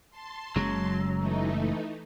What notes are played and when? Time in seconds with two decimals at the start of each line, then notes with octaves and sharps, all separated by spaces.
0.11 A5 C6
0.56 F#1 C#3 F#3 G#3
1.15 E3 A3 D#4